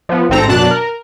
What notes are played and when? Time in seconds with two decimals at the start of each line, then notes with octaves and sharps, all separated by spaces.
0.09 F3 B3
0.30 A1 G#2 C4 A4 A#5 A#6
0.48 F#2 B2 D4 A5 F#6
0.71 A#4